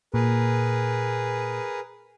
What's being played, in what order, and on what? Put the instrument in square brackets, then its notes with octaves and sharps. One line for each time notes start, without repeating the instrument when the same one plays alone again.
[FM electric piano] A#2 [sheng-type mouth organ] G#4 A#4 B4